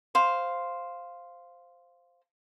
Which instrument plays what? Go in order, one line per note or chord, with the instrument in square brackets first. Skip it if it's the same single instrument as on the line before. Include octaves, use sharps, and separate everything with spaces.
[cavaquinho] C5 F5